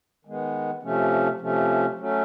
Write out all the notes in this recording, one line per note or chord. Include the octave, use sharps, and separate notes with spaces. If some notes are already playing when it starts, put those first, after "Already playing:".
D#3 G#3 B3
C3 F3 A3 C#4
C3 F3 A3 C#4
F#3 A3 C#4